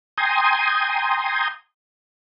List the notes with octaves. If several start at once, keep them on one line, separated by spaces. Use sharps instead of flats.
G5 G#5 A#5 C6 D#6